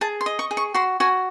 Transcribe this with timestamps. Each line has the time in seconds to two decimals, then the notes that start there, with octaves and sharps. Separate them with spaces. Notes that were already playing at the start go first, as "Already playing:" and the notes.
0.01 G#4 A5
0.21 C6
0.26 D#5
0.39 C#6
0.51 G#4
0.57 C#6
0.74 F#4 C6
1.00 F#4 G#5